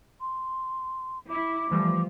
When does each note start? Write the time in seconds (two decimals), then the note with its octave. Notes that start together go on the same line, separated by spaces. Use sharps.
0.21 C6
1.30 E4 D6
1.72 E3 F3 G3 A3